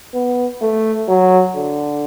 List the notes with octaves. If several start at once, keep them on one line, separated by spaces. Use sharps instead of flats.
B3
A3
F#3
D3